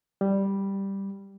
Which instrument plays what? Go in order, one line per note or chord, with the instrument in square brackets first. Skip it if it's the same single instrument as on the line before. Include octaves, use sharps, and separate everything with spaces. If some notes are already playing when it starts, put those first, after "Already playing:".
[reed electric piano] G3